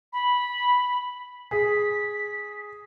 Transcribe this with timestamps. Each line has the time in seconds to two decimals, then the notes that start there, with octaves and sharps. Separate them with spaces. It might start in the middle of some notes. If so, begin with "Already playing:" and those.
0.12 B5
1.51 G#4 B6